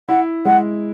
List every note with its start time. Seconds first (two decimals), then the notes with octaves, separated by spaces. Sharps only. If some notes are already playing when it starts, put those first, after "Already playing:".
0.09 E4 F#5
0.45 G#3 F#5